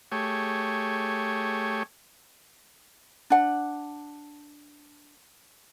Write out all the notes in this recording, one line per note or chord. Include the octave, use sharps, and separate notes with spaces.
A3 G4 G#4 C#5
D4 F#5